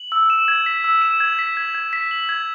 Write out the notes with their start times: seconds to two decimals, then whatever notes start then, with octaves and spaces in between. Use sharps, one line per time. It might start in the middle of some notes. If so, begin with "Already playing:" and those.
Already playing: F#7
0.12 E6
0.30 E7
0.48 G#6
0.66 B6
0.84 E6
1.02 E7
1.20 G#6
1.39 B6
1.57 G#6
1.75 G#6
1.93 B6
2.11 F#7
2.29 G#6